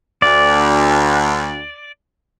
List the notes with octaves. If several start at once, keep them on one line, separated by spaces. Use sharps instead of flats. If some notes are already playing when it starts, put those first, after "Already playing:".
D2 D5